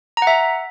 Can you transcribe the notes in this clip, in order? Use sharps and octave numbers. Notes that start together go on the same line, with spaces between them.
E5 F#5 A#5